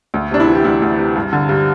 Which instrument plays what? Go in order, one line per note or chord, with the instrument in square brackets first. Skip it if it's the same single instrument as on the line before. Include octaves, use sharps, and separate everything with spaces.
[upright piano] D2
C3 D4
E4
E3
G4
D2 E4
D2
C3
G2
D3
G2